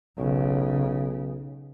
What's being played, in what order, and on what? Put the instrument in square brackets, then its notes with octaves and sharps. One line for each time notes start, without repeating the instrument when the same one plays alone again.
[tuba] B1 [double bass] C#3